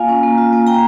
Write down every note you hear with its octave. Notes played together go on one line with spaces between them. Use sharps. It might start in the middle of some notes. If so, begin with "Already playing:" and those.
Already playing: A#3 F4 F5 G#5
C#4
A#3
F4
A#3
A#3 G5 A#5